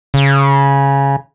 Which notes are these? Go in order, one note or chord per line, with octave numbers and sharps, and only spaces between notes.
C#3